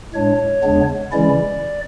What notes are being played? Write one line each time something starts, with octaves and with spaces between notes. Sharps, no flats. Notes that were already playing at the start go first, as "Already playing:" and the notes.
A2 G#3 D4 C#5
E2 C#3 G#3 B3 D4
C#3 E3 G#3 C#4 E4 D5